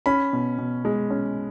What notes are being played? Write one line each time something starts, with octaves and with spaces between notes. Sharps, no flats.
C#4 B5
B2
B2
G#3
C#4